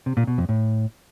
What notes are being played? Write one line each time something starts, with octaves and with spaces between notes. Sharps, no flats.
C3
A#2
B2
F2
A2